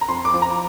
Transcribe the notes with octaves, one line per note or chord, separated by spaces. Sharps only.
A#5
F2 C6
D6
F3
A#5